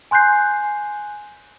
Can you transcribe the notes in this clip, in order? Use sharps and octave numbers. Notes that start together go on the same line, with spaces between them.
G#5 C6 F#6 G6 C7